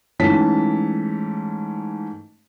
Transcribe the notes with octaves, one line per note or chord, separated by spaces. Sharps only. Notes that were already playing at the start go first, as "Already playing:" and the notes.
G#2 E3 A3 C#4 A5 B6